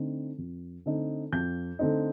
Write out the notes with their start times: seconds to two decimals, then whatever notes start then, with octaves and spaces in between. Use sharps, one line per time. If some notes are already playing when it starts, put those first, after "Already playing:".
Already playing: D3 A3 C4 D#4
0.38 F2
0.86 D3 A3 C4 D#4
1.32 F2 G6
1.79 D3 A3 C4 D#4